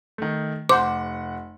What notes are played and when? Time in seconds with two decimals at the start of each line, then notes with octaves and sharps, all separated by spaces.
0.18 D#3 A3
0.69 F1 C5 F#5 D6